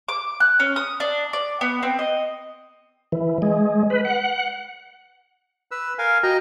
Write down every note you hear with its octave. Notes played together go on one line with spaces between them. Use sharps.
D6
F#6
C#4
D#6
D4
D5
B3
C4
D#5
E3
G#3
B4
F#5
B4 E6
A#4 F5 G#5
F#4 D#5 G5 A#5